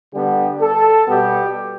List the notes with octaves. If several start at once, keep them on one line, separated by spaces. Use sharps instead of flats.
D3 G3 B3 G4
A4
B2 G3 B3 G4